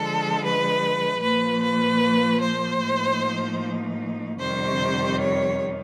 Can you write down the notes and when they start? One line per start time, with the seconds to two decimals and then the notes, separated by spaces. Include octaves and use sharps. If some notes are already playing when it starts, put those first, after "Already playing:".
Already playing: D3 F3 G#3 A4
0.43 B4
1.22 A#2 F3 A#3 B4
1.62 B4
2.41 C5
2.81 A2 F3 A#3 D#4
4.39 F2 C3 D#3 G3 C5
5.18 C#5